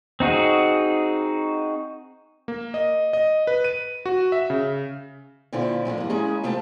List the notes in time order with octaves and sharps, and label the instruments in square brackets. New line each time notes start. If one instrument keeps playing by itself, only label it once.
[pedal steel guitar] C4 D#4 F#4 G#4
[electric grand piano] A#3
D#5
D#5
B4
D#7
F#4
E5
C#3
[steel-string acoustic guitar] A#2 D3 C4 C#4 E4 F4
A2 D3 F3 F#3
G2 A#3
G#3 A#3 C#4 E4 G#4 A#5
C3 A3 C4 F4 A4 A5